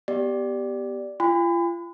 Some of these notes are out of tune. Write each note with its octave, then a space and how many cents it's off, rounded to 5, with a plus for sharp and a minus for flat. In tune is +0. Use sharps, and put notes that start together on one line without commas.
B3 +0 G4 +0 D5 +0
F4 -35 G#5 -45 B5 +40